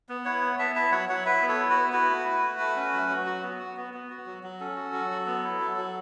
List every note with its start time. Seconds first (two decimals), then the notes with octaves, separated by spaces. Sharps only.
0.09 B3
0.25 E4 C#5 F#5
0.41 B3
0.59 B3 E5 A5
0.75 E4 E5 A5
0.92 F#3 C#5 F#5
1.09 F#3 C#5 F#5
1.25 E4 B4 E5
1.42 B3
1.48 A4 C#5
1.59 E4
1.70 F#4 B4
1.76 B3
1.92 E4 F#4 B4
2.09 A3
2.25 E4
2.43 A3
2.59 A3
2.76 C#4
2.93 F#3
3.09 F#3
3.26 F#4
3.43 B3
3.59 F#4
3.77 B3
3.94 B3
4.10 F#4
4.26 F#3
4.43 F#3
4.60 C#4 A4
4.76 F#4
4.93 F#3
5.11 F#3
5.27 B3
5.44 E4
5.60 F#3
5.77 F#3